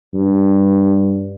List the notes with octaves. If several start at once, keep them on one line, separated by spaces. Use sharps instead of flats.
G2